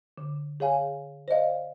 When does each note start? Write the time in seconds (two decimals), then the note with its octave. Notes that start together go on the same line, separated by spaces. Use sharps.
0.18 D3
0.60 G#4 C#5 F5 G#5
1.28 C5 D5 D#5 F5